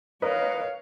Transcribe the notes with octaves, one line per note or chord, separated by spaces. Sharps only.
A#4 B4 C#5 D#5 F5